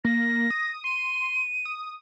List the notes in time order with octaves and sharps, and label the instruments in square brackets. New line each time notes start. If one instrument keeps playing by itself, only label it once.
[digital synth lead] A#3 [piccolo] A#6
[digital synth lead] D#6
[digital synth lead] C6 [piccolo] D#7
[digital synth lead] D#6